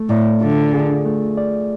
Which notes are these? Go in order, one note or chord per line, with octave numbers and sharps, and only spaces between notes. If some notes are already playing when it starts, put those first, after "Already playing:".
Already playing: A3
A2 D5
D3 F4
G#4
A3
D5